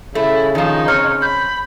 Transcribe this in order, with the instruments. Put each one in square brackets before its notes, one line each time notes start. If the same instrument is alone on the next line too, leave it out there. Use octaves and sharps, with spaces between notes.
[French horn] C#3 [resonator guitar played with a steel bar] A3 [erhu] E4
[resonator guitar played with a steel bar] D#3 F3 [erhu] D#4
[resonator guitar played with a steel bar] C4 C#5 [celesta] F6
[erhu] B5 [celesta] G6